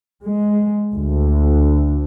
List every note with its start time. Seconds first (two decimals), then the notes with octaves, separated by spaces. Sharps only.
0.24 G#3
0.94 D2